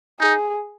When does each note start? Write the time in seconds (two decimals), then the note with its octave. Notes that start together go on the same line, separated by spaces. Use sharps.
0.20 D#4 G#4